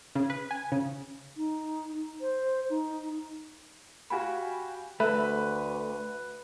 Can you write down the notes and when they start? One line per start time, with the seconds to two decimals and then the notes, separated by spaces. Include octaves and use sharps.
0.15 C#3
0.30 B4
0.51 G#5
0.72 C#3
1.36 D#4
2.20 C5
2.69 D#4
4.10 F#4 G4 F5 G5 G#5 B5
5.00 D2 A3 A4 B4 E5 B5